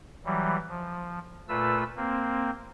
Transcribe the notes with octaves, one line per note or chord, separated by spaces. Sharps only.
E3 F#3 G3
F3
A#2 A3 F4 B4 E6
A#3 C4